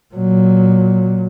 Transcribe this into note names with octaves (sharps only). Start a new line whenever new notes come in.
A#2 F#3